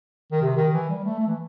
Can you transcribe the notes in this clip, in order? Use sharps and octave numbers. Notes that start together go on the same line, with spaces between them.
D#3
C3
D#3
E3
G3
A3
A3
E3